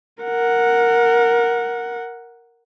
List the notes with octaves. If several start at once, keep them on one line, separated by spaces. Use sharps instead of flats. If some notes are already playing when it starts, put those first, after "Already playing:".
A#4 F#5